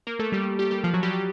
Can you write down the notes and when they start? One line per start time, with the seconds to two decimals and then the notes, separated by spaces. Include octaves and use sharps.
0.07 A#3 A#4
0.19 A3 A4
0.32 G3 G4
0.59 G3 G4
0.71 G3 G4
0.84 F3 F4
0.94 F#3 F#4
1.03 G3 G4
1.13 G3 G4